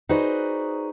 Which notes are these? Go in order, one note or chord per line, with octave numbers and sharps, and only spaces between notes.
D#4 F#4 G#4 B4 C5 D5